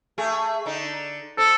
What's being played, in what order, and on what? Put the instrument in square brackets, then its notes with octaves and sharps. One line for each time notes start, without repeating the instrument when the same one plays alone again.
[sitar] A3 G#4
D3 D#4
[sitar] C4 [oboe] A4